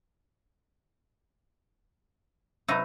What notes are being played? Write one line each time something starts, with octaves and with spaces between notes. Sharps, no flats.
C3 F#3 D#4 B4 E5